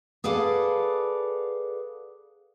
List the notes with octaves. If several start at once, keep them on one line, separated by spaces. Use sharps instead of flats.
G#4 A4 B4 D5 F5 F#5